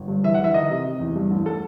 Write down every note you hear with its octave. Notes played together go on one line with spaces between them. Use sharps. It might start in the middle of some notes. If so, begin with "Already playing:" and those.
Already playing: G1
G2
E3 E5
F#5
E3 E5
D#3 D#5
C3
C3
E2
G2
A1
A4